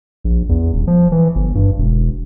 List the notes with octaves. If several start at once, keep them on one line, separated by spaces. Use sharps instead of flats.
A#1
E2
D#1
F3
E3
G1
G2
E1